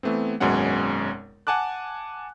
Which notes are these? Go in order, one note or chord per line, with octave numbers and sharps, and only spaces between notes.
E3 A3 B3 C4
G#1 F#2 B2 G#3 C#4 F#5
F#5 G#5 A5 D6 F#6